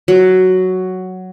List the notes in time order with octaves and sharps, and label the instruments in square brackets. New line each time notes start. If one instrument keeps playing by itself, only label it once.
[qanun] F#3